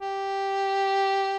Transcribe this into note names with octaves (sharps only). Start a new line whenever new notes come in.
G4